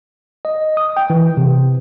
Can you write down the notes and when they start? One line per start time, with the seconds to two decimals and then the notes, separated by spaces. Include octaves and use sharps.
0.45 D#5
0.77 D#6
0.97 G5
1.10 E3
1.37 C3